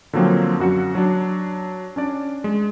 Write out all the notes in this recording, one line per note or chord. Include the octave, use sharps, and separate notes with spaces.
D3 F3 F#3 A#3 C4
F#2 F#4 C#7
F#3 D4
C#4 D4 D5
G#3